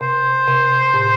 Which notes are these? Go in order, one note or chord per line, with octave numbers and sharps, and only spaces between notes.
C3 C5
C3
A2